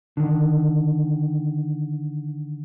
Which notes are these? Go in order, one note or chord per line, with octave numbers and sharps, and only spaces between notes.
D3 D#3